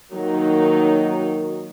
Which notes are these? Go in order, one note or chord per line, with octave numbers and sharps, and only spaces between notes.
D#3 F#3 A#3 D#4